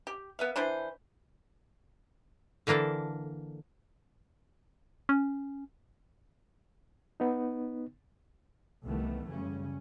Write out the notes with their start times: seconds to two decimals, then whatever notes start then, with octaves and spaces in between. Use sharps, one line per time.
0.07 G4
0.39 B3 E5 F5
0.56 E3 D4 E4 C5
2.67 D3 E3 A#3 D4 A4
5.09 C#4
7.20 B3 D#4
8.84 C2 D#3 E3 G3 A3 B3
9.27 F#2 C#3 G3 C#4